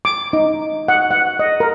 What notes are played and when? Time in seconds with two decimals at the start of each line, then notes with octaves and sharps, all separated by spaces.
0.05 D6
0.33 D#4
0.88 F#5
1.11 F#5
1.39 D#5
1.60 A#4